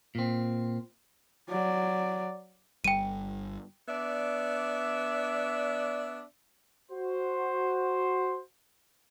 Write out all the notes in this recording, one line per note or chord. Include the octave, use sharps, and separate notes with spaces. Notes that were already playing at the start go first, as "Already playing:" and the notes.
A#2 C4
F#3 D5
G1 G3 G5 D#7
B3 D4 D5 E5
F#4 C5